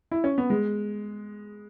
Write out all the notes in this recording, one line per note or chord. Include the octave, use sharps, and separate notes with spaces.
E4
C#4
B3
G#3